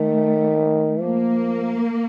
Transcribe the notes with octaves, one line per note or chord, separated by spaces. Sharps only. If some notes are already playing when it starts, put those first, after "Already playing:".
Already playing: D#3 A3
F3 A#3